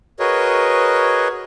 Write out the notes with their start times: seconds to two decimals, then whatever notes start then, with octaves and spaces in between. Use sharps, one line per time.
0.20 F#4 G#4 A#4 B4 C#5 D#5